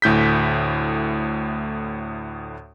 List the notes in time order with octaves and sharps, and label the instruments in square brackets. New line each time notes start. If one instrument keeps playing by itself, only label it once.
[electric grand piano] D2 A2 G6 B6